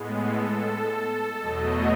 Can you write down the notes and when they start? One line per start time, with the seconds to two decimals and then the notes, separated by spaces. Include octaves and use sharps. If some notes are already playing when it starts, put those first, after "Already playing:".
Already playing: A2 G#3 B3
0.17 A4
1.39 E2 B2 F#3 A3 D#5